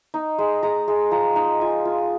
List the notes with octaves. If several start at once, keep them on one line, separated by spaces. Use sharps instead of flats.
D#4
G#3
G#3 A#5
G#3
F3 A#5
D#4
F4 G#5
F4